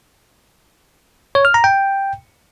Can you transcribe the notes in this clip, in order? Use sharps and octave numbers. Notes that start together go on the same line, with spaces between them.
C#5
F6
A#5
G5